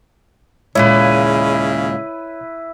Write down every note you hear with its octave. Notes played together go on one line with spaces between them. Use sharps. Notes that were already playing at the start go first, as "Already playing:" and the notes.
D#2 A#2 C#3 G#3 E4 B4 C#5